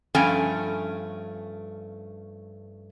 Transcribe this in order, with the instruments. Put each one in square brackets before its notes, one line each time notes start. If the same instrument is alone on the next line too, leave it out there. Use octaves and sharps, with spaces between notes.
[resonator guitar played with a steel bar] G2 F3 A3 C#4 G5 G#5